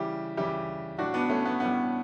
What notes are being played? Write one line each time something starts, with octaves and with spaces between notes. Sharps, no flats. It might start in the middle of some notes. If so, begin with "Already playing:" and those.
Already playing: C#3 E3 G3 E4 G4
C#3 E3 G3 E4 G4
A2 G3 D4 F#4
B3 D4
A3 C#4
B3
A2 G3 B3